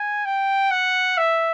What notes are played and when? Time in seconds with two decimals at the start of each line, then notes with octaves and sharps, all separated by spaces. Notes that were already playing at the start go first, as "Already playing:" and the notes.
Already playing: G#5
0.25 G5
0.71 F#5
1.18 E5